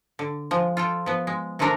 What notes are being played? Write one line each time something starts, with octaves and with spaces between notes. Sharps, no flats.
D3
F3 G#3
F4 A4 G5
F3 B3
G#3
C3 D#3 G#3 A3 D4 A#4